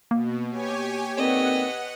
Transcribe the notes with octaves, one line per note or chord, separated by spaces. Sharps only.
B2 A#3
G4 C#5 G#5
D3 D#3 B3 C4 D#5 F#5